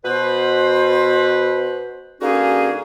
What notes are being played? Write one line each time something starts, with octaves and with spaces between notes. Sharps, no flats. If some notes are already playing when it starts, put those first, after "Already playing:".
B2 B4 C5
D3 A#3 C#4 D#4 F#4 G#4